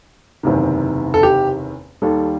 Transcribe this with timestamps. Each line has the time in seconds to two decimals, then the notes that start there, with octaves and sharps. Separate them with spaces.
0.43 F#1 E2 C3 D#3
1.14 A4
1.23 G4
2.02 D#2 D#3 G3 A4